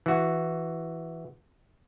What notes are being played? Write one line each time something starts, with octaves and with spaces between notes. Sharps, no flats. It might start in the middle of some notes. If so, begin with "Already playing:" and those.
E3 F#4